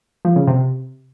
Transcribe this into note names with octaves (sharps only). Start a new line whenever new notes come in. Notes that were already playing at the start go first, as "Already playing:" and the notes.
F3
C#3
C3